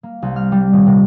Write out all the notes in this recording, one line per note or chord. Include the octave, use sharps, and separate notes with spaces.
A#3
C2
F6
G3
D#1
C3